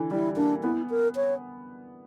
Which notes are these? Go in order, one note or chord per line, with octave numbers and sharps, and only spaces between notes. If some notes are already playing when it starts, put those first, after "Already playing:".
Already playing: D3 E3
G3 E4
A#3 D4
B3 E4
A#4
C#5